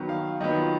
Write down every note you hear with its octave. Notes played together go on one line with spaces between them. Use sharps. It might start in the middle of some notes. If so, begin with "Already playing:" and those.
Already playing: D#3 F#3 B3
F5
D#3 F#3 B3 D#5
F4